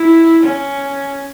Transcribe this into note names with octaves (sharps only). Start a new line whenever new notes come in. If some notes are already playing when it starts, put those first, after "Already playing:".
Already playing: E4
C#4